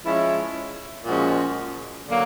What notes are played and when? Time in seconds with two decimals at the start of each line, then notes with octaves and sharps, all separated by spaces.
0.05 F3 G#3 C#4 E4
1.06 A#2 F3 G#3 C#4 F#4
2.07 D3 F#3 A#3